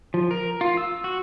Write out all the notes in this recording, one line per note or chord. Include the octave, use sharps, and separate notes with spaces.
F3
A#4
F4
E6
F#4